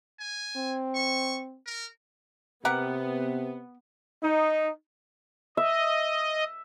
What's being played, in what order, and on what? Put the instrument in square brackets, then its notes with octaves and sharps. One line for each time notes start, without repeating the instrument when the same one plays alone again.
[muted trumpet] G#5
[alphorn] C4
[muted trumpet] C#6
A#4
[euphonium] C3 [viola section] B3 [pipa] G4 A#4 F#5
[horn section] D#4
[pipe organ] D#5 [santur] E5